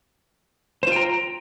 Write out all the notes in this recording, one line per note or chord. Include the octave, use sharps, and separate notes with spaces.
F4 C5 G5 A#5